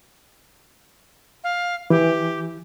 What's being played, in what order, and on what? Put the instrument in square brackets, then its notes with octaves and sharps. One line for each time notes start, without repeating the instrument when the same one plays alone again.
[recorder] F5
[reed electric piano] E3 [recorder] G4